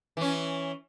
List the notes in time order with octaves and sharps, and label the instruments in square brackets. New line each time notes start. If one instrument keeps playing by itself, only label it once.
[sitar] E3 C#4